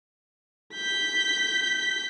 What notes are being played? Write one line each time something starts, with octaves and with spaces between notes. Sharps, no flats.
G6 B6